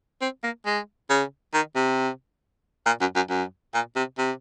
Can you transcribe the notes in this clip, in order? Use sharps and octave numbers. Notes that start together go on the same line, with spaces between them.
C4
A#3
G#3
C#3
D#3
C3
A#2
F#2
F#2
F#2
A#2
C3
C3